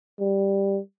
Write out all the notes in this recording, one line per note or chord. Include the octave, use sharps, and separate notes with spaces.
G3